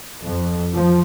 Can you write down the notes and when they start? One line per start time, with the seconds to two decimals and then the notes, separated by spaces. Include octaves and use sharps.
0.21 F2
0.72 F3